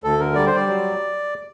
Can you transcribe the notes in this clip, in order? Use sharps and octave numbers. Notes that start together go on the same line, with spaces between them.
D2 A4
D3 A#4
G3 D5
C5
G3 D5
F#3